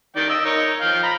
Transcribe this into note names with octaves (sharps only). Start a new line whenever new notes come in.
D#3 D5 G5
D#5 E6
D#4 A#4 C#5
F3 F5 G5
A#5 B5